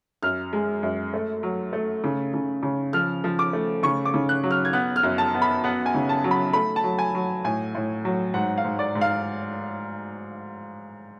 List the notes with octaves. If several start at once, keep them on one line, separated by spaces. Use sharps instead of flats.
F#2 F6
G#3
F#2
A3
F#3
A3
C#3
C#3
C#3
F3 F6
F3
D6
A3
C#3 C#6
D6
C#3
F#6
F#3
F6
G#6
B3 F#6
F6
F#2
A5
B3
B5
B3 F#5
G#5
C#3
A5
F#3
B5
A3 B5
A5
F#3
G#5
F#3
A2 G#5
A2
F#3
G#2 F#5
F5
G#2
D5
G#2
F5